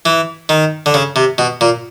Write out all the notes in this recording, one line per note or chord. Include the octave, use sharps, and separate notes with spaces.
E3
D#3
D3
C#3
C3
B2
A#2